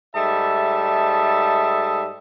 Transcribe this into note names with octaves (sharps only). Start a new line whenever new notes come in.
G#2 G3 A3 D#5 E5 A5